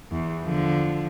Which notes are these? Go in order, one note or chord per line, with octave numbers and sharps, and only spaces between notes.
E2
D3 F3